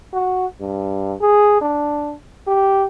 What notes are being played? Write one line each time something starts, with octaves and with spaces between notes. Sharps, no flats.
F#4
G2
G#4
D4
G4